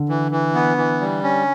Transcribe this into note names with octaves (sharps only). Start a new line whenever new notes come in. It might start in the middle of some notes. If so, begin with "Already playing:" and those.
Already playing: D3
E3
E3
B3
E3
G3
C#4